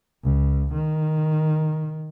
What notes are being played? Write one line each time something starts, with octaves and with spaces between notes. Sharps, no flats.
C#2
D#3